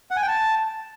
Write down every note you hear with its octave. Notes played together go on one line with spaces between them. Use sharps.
F#5
G#5
G5
A5